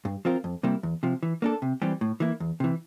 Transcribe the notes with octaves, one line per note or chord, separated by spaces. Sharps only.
G2
F3 C4 F4 A#4
F2
C3 G3 A#3 E4
E2
C3 F3
E3
A#3 D4 A4
C3
E3 G3 C4 G4
A2
E3 A#3 E4
E2
C3 E3